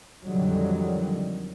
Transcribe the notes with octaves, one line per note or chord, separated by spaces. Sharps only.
F2 D3 D#3 F#3 G3